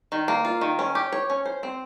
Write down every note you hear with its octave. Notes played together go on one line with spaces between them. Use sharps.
D#3
A#3
F4
D#3
C#4
G4
C#5
C#4
C5
C4